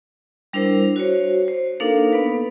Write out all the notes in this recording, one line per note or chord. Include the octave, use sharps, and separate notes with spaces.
G3 D4 E4 A#4 C5
F#4 C5 C#5
C5
A#3 D4 D#4 A4 A#4 F5
B3 B4